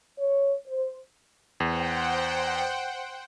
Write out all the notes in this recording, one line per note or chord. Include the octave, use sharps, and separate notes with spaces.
C#5
C5
E2 C5 F#5 G5